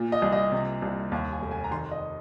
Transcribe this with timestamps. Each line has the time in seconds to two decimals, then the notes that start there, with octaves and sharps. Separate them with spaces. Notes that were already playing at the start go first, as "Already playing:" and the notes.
Already playing: A#2
0.12 D#5
0.22 C2
0.32 D#5
0.52 C3
0.82 C2
1.12 D#2 F5
1.32 G#5
1.42 F1
1.51 G#5
1.64 A#5
1.71 D#3 C6
1.91 D#5